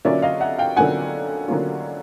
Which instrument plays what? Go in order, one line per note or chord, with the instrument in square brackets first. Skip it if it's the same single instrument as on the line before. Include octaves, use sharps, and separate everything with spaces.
[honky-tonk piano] D3 F#3 A#3 C#4 F4 [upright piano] D5 E5
[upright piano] D#5 F5
E5 F#5
F5 G5
[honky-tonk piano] D3 F#3 A#3 C#4 F4 [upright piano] F#5 G#5
[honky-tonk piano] D3 F#3 A#3 C#4 F4